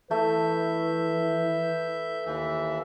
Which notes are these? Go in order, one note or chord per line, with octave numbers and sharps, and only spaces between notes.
E3 A3 B4 E5 G6
D#2 E3 E5